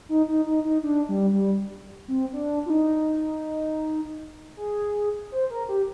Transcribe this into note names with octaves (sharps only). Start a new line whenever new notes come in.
D#4
D#4
D#4
D#4
D4
G3
G3
C4
D4
F4
D#4
G#4
C5
A#4
G4